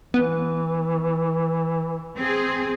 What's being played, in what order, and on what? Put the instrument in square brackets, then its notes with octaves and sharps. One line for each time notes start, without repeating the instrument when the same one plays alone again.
[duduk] E3 [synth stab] B3
[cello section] C4 G#4